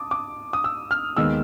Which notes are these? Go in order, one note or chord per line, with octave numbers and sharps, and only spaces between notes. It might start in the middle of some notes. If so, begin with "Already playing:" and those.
Already playing: A5 D6 D#6
D6
D#6
E6
F6
D#2 D#3 G#3 B3 E6